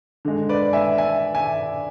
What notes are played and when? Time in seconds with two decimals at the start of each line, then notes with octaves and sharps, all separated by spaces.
0.25 D3 G#3
0.49 B4 D5
0.73 E5 G#5
0.98 E5 G#5
1.34 E5 G#5